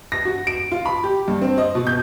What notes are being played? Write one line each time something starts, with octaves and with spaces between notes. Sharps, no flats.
A#6
F#4
D7
F4
B5
G4
G2
C4
D#5
B2
G6